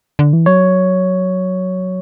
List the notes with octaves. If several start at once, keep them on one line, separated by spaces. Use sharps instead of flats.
D3
E3
F#3 C#5